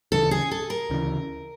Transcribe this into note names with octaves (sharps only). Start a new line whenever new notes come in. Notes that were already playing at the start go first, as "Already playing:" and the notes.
D2 C#3 E3 A4
G#4
A4
A#4
D2 C#3 E3